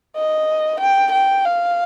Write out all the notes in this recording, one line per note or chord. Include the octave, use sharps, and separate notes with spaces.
D#5
G5
G5
F5